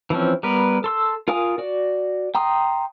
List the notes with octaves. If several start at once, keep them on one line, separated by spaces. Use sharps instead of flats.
E3 F3 C4 C#4
G3 B3 A#4 B4
A4 C6 E6
F4 A#4 F5 G#5 D#6
F#4 D5
G5 A#5 C6 D#6